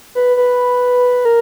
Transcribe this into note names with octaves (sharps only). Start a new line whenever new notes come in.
B4
B4
A#4